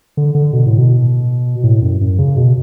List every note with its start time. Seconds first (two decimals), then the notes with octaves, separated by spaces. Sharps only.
0.17 D3
0.35 D3
0.53 B2
0.66 A2
0.78 B2
1.64 A2
1.82 F#2
2.01 F#2
2.19 C#3
2.36 B2